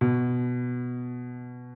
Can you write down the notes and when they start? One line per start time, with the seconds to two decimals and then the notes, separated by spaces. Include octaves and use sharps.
0.01 B2